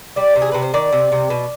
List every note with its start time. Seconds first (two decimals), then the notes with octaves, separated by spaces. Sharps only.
0.16 G3 D5
0.36 C3
0.42 G#4
0.52 C3 B4
0.62 C5
0.74 D#3 D5
0.93 C3
1.12 C3
1.30 B2